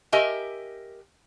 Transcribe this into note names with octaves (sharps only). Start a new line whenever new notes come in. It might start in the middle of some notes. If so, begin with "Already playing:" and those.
G4 A#4 D#5 E5 G#5